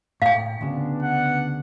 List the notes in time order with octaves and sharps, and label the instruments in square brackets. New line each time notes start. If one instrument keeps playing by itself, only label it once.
[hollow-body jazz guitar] A2 [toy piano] F5 G5
[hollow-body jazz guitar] D2 C#3 [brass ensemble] B3 D4
[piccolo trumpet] F#5